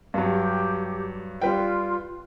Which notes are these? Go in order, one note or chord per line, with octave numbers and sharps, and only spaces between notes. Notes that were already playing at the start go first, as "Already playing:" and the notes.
G2 F#3 G4
G3 F4 B4 G5